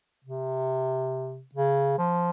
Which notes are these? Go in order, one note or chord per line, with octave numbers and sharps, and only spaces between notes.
C3
C#3
F3